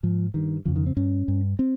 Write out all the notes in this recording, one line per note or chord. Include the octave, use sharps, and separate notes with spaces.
G#2 F3
G2 D#3
F2 C#3 F3
D#3
C4
G2 C#4
G2
C4